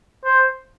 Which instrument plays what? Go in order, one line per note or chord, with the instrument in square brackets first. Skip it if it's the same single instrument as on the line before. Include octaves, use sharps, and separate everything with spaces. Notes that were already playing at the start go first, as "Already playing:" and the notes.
[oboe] C5